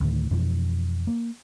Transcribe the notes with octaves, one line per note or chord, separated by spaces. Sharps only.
D2 A2 D#3
F2 B2 E3 F3
A#3